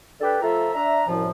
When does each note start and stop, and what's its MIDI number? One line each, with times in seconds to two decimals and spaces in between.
0.21 0.37 62
0.21 0.37 67
0.21 0.37 69
0.21 0.37 71
0.42 0.69 53
0.42 0.69 57
0.42 0.69 65
0.42 0.69 69
0.42 0.69 76
0.42 0.69 82
0.74 1.02 62
0.74 1.02 76
0.74 1.02 82
1.08 1.29 36
1.08 1.29 42
1.08 1.29 45
1.08 1.29 53